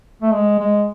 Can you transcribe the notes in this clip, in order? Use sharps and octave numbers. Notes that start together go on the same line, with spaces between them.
A3
G#3
G#3